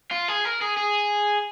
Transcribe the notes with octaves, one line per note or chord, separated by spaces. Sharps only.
F4
G#4
A#4
G#4
G#4